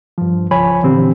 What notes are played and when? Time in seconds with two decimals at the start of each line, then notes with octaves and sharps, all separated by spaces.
0.18 G2 F3
0.51 C#2 F3 C#5 G#5 B5
0.83 A#2 D3 E3 C4 G4